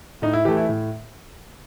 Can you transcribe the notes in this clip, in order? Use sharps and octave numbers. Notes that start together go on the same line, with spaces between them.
A2 D#4
E4
E3 A3 G4
E4
A2